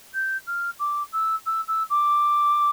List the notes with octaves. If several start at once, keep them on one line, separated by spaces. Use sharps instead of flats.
G6
F6
D6
E6
E6
E6
D6